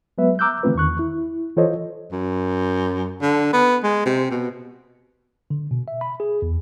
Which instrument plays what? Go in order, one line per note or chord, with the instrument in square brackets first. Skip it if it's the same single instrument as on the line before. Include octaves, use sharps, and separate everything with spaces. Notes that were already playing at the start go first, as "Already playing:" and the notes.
[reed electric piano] F#3 G#3 B3 B4 E5
A#5 D6 E6 F#6 G6
D3 E3 A3 C4 F4 B4
E2 D#3 C#6 F#6
E4
E3 F4 A4 C5 C#5 D#5
[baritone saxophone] F#2
D3
B3
G#3
C3
B2
[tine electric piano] D3
B2
E5
B5
G#4
E2